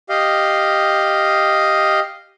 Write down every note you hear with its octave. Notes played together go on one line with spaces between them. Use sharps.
G4 D#5 F5